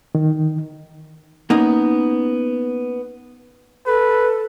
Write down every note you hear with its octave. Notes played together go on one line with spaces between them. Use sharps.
D#3
A#3 B3 C#4 D#4
A4 B4